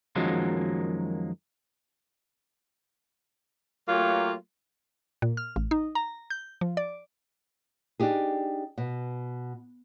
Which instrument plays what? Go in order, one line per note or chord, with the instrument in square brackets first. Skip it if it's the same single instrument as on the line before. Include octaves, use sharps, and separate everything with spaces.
[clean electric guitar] F#2 D#3 F3 F#3 G#3 A#3
[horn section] F#3 A3 A#3 F4 G4 C#5
[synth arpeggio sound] A#2
F6
A1
D#4
A#5
G6
F3
D5
[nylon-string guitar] D4 D#4 G4 G#4
B2